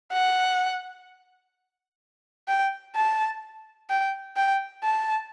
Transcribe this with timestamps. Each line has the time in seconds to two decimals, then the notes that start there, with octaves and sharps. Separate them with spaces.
0.13 F#5
2.48 G5
2.96 A5
3.90 G5
4.37 G5
4.84 A5